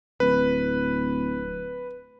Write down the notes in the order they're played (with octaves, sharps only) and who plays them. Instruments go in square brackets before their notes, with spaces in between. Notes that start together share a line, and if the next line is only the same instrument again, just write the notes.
[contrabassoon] D1 [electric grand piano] B4